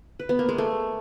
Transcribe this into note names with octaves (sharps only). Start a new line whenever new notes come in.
B4
B3
A#3
G#3
A3